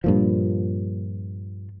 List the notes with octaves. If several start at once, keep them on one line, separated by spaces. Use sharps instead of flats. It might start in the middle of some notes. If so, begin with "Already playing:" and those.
G2 A#2 F3